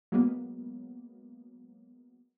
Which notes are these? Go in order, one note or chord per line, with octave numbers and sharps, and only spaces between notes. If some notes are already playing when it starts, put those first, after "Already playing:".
F#3 G#3 A#3 B3